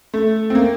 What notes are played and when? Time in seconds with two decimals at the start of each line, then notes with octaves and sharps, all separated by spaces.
0.14 A3
0.50 C4
0.55 A#3